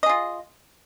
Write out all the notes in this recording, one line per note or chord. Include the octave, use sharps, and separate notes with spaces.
F4 G#4 D#5